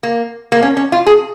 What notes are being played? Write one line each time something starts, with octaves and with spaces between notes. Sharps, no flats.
A#3
A#3
C#4
C#4
F4
G#4